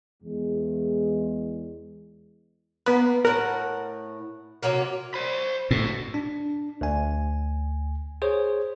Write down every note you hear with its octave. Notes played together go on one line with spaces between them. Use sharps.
E2 G#3
A#3 B3 B4
A2 A#4 F#5
C3 F#3 A#3
C5 B5
D#2 A2 F#4
D4
D2 G#5
G#4 C5 C#5